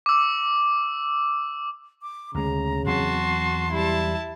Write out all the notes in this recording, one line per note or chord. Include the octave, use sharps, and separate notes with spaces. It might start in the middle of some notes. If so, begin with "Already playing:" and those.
D6 E6
D6
D2 C#3 G#3 A#5
E2 F#3 C4 F#4 A5 C6
G3 E4 A5